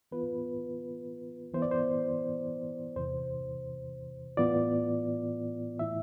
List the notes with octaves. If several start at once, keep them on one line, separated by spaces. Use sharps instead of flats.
E3 B3 F4 B4
E3 B3 E4 C5
D5
C5
E2 C3 E3 C5
A2 E3 B3 F4 D5
A2 E3 A3 E4 E5